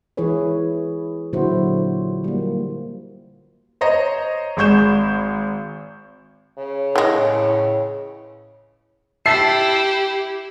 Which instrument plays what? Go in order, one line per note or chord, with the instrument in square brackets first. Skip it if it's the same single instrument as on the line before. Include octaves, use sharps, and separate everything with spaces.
[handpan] E3 E4 G#4 B4 C#5
A#2 D3 F#3 E4 F#4 C5
G3 A#3
[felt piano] C5 C#5 D#5 A#5
G#1 G#3 C#6 G6 E7
[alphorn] C#3
[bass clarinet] A2 [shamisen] E3 G#3
[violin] E4 G4 [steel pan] E5 A5 [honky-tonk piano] C7